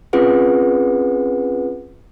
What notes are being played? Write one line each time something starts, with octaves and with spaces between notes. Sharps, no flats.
C4 C#4 F4 G#4 B4 F#5